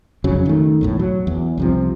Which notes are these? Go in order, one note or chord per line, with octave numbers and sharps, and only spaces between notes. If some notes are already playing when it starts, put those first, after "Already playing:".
F2 C#3 F#3
D#3 A3
B1 E2 A2
F#3
E2
C2 C3 F3